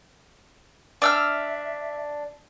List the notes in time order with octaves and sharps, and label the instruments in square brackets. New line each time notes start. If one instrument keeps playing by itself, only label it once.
[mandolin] D4 E6 F6 [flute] E5